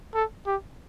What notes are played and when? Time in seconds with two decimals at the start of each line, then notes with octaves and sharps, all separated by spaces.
0.14 A4
0.46 G4